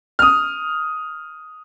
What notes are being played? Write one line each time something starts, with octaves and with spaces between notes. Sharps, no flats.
D#6 F6